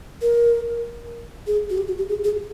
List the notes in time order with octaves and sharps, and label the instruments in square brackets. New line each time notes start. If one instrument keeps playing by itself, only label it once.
[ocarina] A#4
G#4
F#4
G4
F#4
G4
G#4
G#4